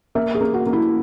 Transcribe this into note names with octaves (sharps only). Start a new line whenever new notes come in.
A#3 E5
G#4
A#3
F#4
A#3
E4